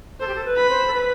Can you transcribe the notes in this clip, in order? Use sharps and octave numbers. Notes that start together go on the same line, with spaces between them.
A4 C5
G4
A4
B4
B5
C5
A4
B4